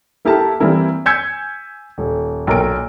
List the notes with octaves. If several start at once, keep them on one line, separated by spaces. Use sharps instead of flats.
A#3 E4 G4 A4 A#4 A5
E3 G3 A#3 C4 E4 A#4
G#5 E6 G6 G#6 B6 C#7
D#1
B1 A#2 A#4 G5 D7